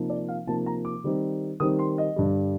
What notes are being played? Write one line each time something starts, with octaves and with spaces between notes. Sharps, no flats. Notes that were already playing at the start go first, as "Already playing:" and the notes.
Already playing: C3 F3 A#3 D#4
D5
F5
C3 F3 A#3 D#4 A5
A#5
D6
D#3 G3 C4 D#4
D#3 G3 C4 D#4 D#6
C6
D#5
G2 D3 G3